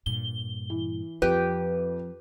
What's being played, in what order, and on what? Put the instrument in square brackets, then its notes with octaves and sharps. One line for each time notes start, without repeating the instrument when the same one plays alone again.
[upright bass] G2 A#2 [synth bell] G7
[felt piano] E3
[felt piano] F2 [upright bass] F3 C4 [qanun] G4 [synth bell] B4